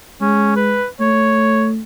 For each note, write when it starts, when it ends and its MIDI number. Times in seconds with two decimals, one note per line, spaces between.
0.21 0.80 56
0.21 0.55 61
0.56 0.86 71
1.00 1.82 57
1.00 1.68 73